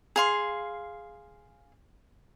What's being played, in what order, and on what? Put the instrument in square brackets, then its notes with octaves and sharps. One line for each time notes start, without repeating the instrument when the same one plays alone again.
[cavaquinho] G#4 F5 C6